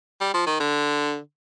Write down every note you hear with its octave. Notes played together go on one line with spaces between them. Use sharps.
G3
F3
D#3
D3